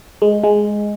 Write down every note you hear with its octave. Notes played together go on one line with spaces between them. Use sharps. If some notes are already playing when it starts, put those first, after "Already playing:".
G#3
G#3